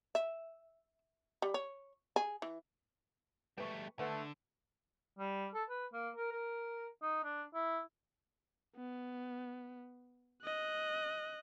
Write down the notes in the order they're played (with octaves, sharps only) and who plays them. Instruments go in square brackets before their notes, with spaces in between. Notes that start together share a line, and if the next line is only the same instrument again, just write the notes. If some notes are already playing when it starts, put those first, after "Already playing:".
[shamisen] E5
G3
C#5
G#4
E3
[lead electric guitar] G3 A3 [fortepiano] B4 C#6
[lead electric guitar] D3 [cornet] A3 [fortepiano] B4 F#5
[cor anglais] G3
A4
B4
A#3
A#4
A#4
D#4
D4
E4
[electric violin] B3
D#5 F#6